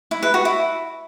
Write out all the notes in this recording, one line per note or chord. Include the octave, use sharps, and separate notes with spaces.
E4
B4
F#4
E4